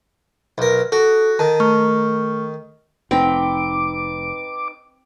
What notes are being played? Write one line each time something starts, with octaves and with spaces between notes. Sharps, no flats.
B1 A#4
F#4 A4
D#3 A5
A3 C#6 F6
F1 C4 D#4 B4 G5 D6